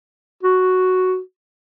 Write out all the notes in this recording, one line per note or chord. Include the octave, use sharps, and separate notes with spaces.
F#4